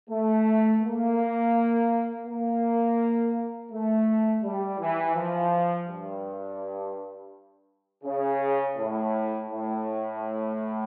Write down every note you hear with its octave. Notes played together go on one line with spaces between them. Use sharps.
A3
A#3
A#3
A3
G3
E3
F3
G2
C#3
A2
A2